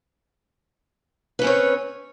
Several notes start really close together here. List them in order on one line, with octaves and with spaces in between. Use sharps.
B4 C#4 C4 C#5